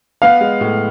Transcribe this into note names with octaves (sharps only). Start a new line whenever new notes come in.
B3 F5
G#3
A2